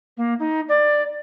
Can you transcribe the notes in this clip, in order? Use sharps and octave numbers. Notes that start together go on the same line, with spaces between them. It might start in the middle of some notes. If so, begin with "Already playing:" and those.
A#3
D#4
D5